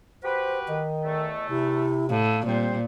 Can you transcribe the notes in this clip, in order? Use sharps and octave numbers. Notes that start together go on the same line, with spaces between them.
F#4 G4 B4 C5
D#3 D#5
E2 A3
C3 E4
A2 F5
A#2 G3 C4 C5